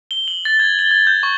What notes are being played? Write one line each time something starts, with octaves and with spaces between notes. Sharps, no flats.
G7
F#7
A6
G#6
G7
G#6
G6
C#6